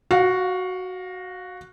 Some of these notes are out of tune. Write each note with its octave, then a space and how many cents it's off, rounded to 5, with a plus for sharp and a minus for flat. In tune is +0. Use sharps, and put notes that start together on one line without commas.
F#4 +0 F5 +30